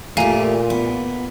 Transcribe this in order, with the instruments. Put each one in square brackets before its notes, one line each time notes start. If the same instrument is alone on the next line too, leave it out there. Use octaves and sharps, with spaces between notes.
[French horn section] A#2 [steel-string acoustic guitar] A3 G4 [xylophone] F5 G#5 A#5
[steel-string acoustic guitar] B3